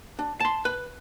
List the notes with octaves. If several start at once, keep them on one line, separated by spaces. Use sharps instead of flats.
D4
A5 C6
B4